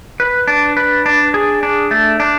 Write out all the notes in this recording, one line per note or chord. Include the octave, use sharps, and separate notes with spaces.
B4
D4
B4
D4
G#4
D4
A3
D4